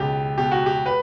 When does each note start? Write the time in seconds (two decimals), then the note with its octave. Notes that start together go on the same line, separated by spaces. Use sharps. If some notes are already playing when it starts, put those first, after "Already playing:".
Already playing: C#2 B2 G4
0.38 B2 G4
0.52 F#4
0.66 G4
0.86 B4